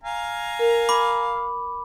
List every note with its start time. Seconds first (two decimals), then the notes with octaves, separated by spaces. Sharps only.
0.04 F5 G#5 A#5
0.59 A#4
0.89 B5 D6